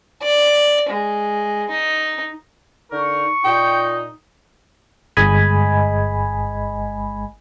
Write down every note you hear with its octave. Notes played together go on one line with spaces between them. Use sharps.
D5
G#3
D#4
D3 D#4 A#4 C#6
A#2 D#4 G5
G1 G#3 D#5 G#5 B5